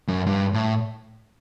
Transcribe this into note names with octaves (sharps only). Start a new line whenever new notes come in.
F#2
G2
A2